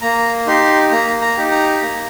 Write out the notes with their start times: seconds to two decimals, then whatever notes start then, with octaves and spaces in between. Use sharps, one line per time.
0.01 A#3 A#5
0.47 D#4 G4 C6
0.91 A#3 A#5
1.21 A#5
1.37 D#4 G4
1.51 A#5
1.82 A#3